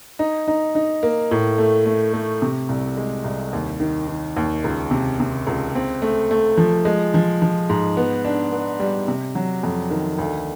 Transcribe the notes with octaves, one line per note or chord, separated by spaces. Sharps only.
D#4
D#4
D#4
A#3
A2
A3
A3
A3
C3
C2
G#3
C2
D#2
D#3
D#3
D#2
C#2
C3
C3
C#2
C4
A3
A3
F3
G#3
F3
F3
G#2
B3
D4
B3
G3
C3
F#3
F2
D#3
D2